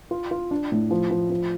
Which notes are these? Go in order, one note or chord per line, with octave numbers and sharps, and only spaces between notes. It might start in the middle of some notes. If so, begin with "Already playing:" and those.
F4
F4
D4
A2
F3
F3
F3